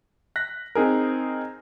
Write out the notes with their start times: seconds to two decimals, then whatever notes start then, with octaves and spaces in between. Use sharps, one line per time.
0.36 F#6 A#6 B6
0.75 C4 D#4 G#4 A#4